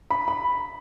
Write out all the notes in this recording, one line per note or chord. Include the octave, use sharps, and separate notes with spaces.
B5
B5